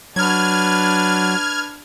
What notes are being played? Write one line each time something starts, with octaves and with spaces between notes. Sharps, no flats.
F#3 D4 B4 F6 G#6